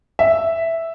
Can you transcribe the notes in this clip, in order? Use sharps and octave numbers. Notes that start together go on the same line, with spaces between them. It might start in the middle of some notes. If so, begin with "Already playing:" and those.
E5